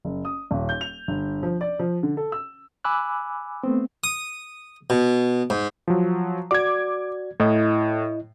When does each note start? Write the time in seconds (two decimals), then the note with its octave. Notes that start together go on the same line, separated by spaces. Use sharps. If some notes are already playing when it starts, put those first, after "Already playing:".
0.05 F#1
0.25 D#6
0.51 D#1
0.69 G6
0.81 F7
1.08 G1
1.43 F3
1.61 D5
1.79 F3
2.03 D3
2.17 A4
2.32 E6
2.84 G#5 B5 D6 E6 F#6
3.63 A3 B3 C4
4.04 D#6
4.90 B2
5.50 G#2
5.88 F3 F#3
6.51 F#4 D5 D6 G#6
7.40 A2 E4 D#5